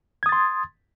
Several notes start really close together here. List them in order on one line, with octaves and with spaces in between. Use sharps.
G#6 D#6 A6 C6